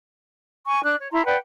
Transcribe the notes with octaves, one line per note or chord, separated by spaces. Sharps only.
G#5 C#6
D4 F#6
C#5
E4 A#5 C6
B4 D5 F#5 G5